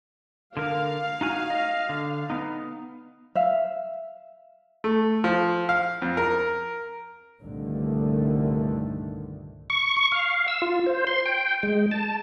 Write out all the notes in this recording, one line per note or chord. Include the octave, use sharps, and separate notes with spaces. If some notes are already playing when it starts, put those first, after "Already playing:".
D3 A#4 F5
D#4 F#4 G#5
D#5
D3
B3 D#4
E5 F5
A3
F3
F5
F2
A#4
C2 G2 A#2 D3 D#3 A3
C#6
C#6
F5
E6
F4
C5
C6
G5
G#3
A5